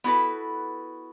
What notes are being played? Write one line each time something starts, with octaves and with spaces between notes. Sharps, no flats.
B3 E4 F#4 A4 B4